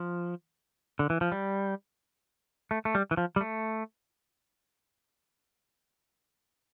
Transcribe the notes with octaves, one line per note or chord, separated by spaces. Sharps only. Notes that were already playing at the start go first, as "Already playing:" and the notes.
Already playing: F3
D3
E3
F3
G3
A3
A3
G3
E3
F3
G3
A3